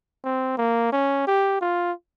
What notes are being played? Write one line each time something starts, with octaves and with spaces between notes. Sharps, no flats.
C4
A#3
C#4
G4
F4